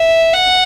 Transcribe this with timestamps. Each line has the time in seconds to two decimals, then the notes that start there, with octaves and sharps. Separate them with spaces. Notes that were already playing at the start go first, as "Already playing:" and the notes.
Already playing: E5
0.34 F#5